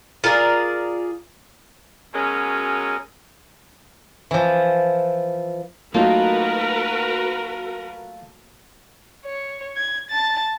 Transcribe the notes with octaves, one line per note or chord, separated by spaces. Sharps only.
F4 G#4 A#4 D5
B2 F#3 G#3 C#4 A#4
E3 F3
F#3 A3 A#3 D#4 F4 F#4 A#4 B4
C#5
G#6
A5 A6